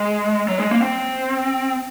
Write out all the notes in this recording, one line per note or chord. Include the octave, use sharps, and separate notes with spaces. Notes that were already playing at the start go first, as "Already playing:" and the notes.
Already playing: G#3
F#3
G#3
A#3
C4